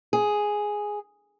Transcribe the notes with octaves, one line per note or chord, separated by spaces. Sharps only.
G#4